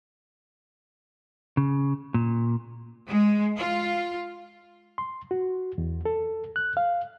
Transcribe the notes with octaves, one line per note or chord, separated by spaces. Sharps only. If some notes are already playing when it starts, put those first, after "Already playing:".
C#3
A#2
G#3
F4
C6
F#4
E2
A4
F#6
F5